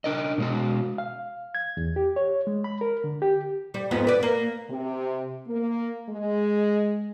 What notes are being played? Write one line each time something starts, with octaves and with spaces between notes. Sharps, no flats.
D4 A#4 D#5
B2 G#3 F#4
F5
G#6
E2
G4
C#5
G#3
B5
A#4
D3
G4
G3
F2 G#2 B3
B4 D5
A#3
C3
A#3
G#3